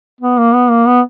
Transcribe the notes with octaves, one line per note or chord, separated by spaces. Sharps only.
B3
A#3
B3
A#3
B3